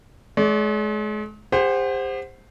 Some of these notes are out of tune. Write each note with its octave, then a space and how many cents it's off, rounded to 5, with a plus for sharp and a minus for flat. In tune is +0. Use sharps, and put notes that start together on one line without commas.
G#3 +40 D5 -40
G4 +40 C5 +0 F#5 +0